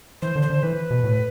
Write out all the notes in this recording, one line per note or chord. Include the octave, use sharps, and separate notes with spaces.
E3 C5
D3
C5
D3
E3 B4
B2
A2